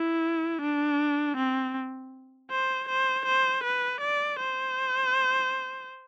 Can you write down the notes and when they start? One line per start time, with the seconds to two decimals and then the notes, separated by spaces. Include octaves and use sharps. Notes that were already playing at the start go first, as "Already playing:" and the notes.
Already playing: E4
0.62 D4
1.37 C4
2.51 C5
2.89 C5
3.26 C5
3.64 B4
4.01 D5
4.40 C5